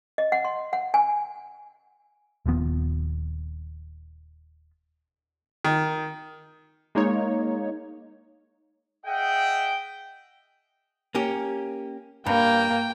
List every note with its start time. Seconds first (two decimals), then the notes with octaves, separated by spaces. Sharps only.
0.18 D#5
0.32 F#5
0.45 C6
0.73 F#5
0.94 G#5
2.46 D#1 D#2 F3 B3
5.65 D#3
6.95 G#3 A#3 D#4 C#5
9.06 G#4 D#5 E5 F#5 G5
11.15 A#3 C#4 G4
12.26 G2 A#3 G5